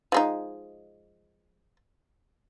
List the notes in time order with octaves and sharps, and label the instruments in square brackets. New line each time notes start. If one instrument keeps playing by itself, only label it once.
[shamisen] F3 G#3 D#4